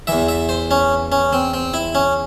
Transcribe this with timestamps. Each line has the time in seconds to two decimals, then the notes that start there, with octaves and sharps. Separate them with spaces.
0.07 E2 E3 E5
0.28 E5
0.49 C5
0.71 C#4
1.12 C#4
1.33 C4
1.54 C4
1.74 E4
1.95 C#4